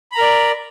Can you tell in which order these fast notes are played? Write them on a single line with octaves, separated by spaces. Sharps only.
B5 A#5 A#4 D5